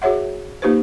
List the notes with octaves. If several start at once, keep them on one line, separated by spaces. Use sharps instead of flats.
F#4 G#4 C#5 E5 F#5
A#3 D#4 F4 G4 B4 C5